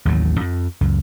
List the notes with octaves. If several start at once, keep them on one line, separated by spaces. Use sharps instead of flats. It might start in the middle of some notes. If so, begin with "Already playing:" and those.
A1 D#2 A2 F#3
F2
C#2 F#2